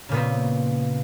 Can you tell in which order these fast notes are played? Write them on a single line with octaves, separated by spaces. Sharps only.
C#3 A#2 B3 C4